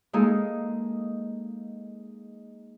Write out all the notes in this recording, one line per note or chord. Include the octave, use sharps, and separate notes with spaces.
G#3 A#3 D#4 G#4 A4